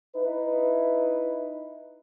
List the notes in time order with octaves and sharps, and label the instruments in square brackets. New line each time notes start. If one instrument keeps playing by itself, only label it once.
[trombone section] D#4 E4 B4